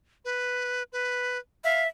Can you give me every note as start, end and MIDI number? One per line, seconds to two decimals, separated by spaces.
0.25 0.83 71
0.93 1.38 71
1.64 1.88 76
1.64 1.83 77